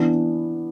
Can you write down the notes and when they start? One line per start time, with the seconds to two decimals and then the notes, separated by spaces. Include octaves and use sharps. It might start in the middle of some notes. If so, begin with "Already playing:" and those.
Already playing: E3 B3 D4